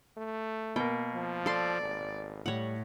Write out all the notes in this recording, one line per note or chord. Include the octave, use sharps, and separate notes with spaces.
A3
B2 A#3 G5
F3
A4 D5 C6
G#1
A2 G3 C#5 F#5